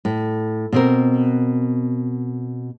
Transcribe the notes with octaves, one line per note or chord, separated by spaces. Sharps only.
A2
B2 C4 A#4